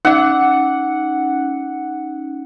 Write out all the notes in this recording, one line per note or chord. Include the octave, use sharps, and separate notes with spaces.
C#4 D#4 F#5